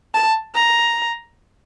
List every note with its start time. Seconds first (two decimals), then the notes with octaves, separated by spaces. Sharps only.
0.14 A5
0.55 A#5